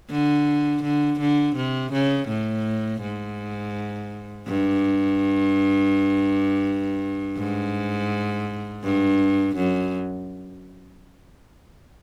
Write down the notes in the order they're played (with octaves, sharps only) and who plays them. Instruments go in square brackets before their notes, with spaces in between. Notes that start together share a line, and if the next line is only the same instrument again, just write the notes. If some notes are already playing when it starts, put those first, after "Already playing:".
[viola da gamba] D3
D3
D3
C3
C#3
A2
G#2
G2
G#2
G2
F#2